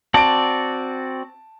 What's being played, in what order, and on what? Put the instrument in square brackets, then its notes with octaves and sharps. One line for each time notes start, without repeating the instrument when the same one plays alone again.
[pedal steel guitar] C4 F#4 D5 [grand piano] A5 D7